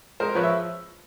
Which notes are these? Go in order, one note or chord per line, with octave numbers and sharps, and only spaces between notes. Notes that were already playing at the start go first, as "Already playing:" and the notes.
G#3 A#4 C5
F3 B4 C#5
E5